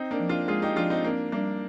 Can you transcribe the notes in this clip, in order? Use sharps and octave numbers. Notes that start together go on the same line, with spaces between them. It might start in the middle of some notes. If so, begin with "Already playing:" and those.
Already playing: C4 D#4
A#3 D4
F3
D4 F4
G#3 F4 G#4
D#4 G4
F3 D4 F4
C4 D#4
A#3 C4 D4
G3 A#3 D4